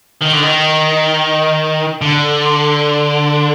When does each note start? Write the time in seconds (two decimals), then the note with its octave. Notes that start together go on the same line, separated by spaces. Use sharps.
0.21 D#3
0.33 D3
0.43 D#3
2.02 D3